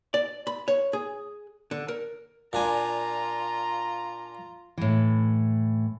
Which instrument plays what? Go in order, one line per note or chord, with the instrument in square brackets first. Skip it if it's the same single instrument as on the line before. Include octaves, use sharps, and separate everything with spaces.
[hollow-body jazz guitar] D5
B5
C#5
G#4
D3
A#4
[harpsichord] A#2 D4 G#5 [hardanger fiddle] F4 A#5
[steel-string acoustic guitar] A2 E3